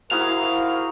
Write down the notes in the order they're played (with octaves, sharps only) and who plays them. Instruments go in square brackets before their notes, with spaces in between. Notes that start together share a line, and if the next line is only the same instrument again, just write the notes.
[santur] D#4 E4 F#4 [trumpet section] G#4 A#4 C5 [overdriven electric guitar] F5